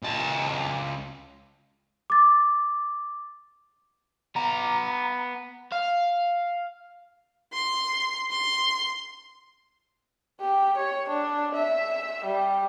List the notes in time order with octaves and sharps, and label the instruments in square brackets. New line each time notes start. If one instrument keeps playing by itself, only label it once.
[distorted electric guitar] C#2 A5
[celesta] D6 A6
[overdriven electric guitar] B3 A#5
F5
[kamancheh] C6
C6
[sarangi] G4
C#5
D4
E5
G3